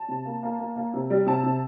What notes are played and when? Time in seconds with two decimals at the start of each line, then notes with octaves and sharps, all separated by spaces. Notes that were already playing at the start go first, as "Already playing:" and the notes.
Already playing: A5
0.08 C3
0.25 A#3
0.43 A#3
0.59 A#3
0.76 A#3
0.94 C3
1.10 G3
1.26 C3 A5
1.43 C3